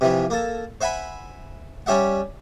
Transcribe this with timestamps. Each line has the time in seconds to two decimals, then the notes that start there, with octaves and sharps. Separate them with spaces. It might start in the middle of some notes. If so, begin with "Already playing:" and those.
0.01 C3 E3 F3
0.30 A#3 A4
0.81 C5 E5 F#5 G#5 B5
1.86 G3 C#4 G4 E5 F#5